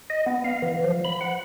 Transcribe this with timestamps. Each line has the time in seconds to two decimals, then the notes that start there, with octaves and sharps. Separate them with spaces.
0.10 D#5
0.26 B3
0.44 F5
0.62 E3
0.84 F3
1.05 B5
1.21 F#5